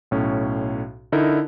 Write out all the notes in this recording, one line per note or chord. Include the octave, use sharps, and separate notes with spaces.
B1 A2 C#4
D3 D#4 E4 A#4